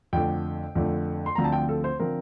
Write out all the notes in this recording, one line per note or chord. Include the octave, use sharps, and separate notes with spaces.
F2 D3 A3 D4 G5
F2 D3 A3 D4
C6
D2 D3 F3 C4 A#5
A5
G5
A4
C5
D3 F3 C4 A#4